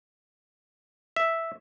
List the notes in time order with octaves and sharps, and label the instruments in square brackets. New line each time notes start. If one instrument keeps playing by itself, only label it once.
[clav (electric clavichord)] E5